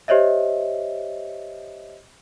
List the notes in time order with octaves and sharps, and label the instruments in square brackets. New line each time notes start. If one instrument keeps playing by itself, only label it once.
[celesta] G4 C5 C#5 D#5 E5